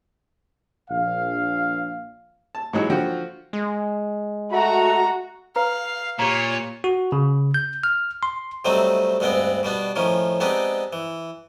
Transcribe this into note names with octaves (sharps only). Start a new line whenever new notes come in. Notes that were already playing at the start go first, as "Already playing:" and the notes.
A#1 F5
A5
G#2 E3 F#3 G#3
D3 F3 F4 F#4 G5
G#3
A3 F#4 A#5
B4 F5 A#5
A#2 G4 C#5 A#5
F#4
C#3
G6
F6
C6
C3 F#3 G3 A3 C4 D#4
D2 G2 G#3 B3 C4 G5
B2 G3 B3 D4
A2 D#3 F3 C#4
G#3 B3 C4 D4 D#4 G4
E3